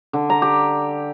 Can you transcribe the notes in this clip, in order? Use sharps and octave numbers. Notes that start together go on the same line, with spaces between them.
D3
A#5
G4